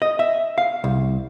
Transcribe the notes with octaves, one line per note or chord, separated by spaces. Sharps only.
D#5
E5
F5
C2